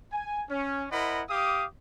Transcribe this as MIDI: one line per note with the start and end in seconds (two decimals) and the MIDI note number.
0.12 0.43 80
0.49 0.86 61
0.92 1.22 64
0.92 1.22 70
0.92 1.22 72
0.92 1.22 75
0.92 1.22 78
0.92 1.22 83
1.29 1.66 67
1.29 1.66 77
1.29 1.66 86
1.29 1.66 87